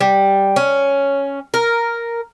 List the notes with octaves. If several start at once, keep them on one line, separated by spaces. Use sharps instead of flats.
G3
C#4
A#4